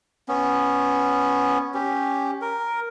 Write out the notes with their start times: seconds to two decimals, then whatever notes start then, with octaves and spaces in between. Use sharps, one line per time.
0.28 B3 C#4
1.74 C#4 G4
2.41 A#4